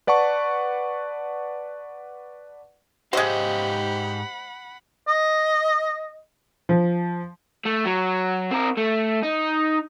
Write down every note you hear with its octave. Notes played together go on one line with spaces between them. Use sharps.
B4 D5 F#5 A5 C#6
G#2 G#3 G4 C5 D#5 F5 F#5 B5
D#5
F3
A3
F#3
C4 A#4
A3
D#4